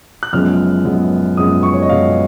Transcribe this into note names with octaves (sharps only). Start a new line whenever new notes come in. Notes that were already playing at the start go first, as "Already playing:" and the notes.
F#6
F#1 F#2 F3 G#3 B3 F6
F#1 F#2 F3 G#3 B3
F#1 F#2 F3 G#3 B3 D#6
C#6
C#5
D#5
F#1 F#2 F3 G#3 B3 F5